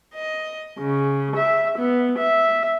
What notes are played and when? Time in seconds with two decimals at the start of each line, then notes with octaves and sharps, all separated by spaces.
0.15 D#5
0.79 C#3
1.35 E5
1.78 B3
2.18 E5